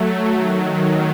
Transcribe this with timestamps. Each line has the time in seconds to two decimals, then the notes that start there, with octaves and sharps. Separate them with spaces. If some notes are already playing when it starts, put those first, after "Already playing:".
Already playing: F#3 A3
0.29 D#3 F#3